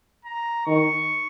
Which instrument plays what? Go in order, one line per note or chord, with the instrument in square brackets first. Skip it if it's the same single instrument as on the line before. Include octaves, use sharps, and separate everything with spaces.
[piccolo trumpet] A#5
[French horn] D#3 [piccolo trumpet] C#6